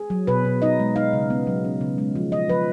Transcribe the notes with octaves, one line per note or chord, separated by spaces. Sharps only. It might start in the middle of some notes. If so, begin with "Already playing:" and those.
Already playing: G#4
F#3
B2 B4
B2
D#4 D#5
G#3
D#4 F5
C#3
B3
F#3
C#4
C#3
G#3
F3
F3 D#5
F3 B4